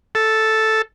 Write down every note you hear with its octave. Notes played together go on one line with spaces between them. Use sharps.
A4